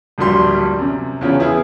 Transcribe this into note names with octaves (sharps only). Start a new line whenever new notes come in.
D1 A#1 A#2 G3 C6
F#2 C3
E2 C#3 F3 C#4
B3 E4 G#4